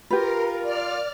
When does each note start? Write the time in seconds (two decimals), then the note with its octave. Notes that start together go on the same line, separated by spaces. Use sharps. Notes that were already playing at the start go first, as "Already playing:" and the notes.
0.11 F4 G4 A#4 B4
0.62 D5 F6